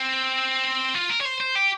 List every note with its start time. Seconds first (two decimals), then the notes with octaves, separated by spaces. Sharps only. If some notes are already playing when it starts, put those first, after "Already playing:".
Already playing: C4
0.95 F4
1.10 A#4
1.21 C#5
1.25 C5
1.40 C5
1.56 G4